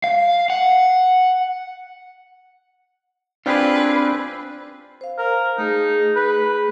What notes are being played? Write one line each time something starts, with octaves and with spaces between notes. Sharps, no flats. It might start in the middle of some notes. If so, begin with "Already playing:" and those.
F5
F#5
C4 D4 F4 G4 G#4 B4
C5 F5
A#4
A3 D#4 G#4
B4